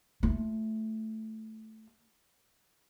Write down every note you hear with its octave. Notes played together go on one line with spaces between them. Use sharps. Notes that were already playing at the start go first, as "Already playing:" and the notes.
A3 F4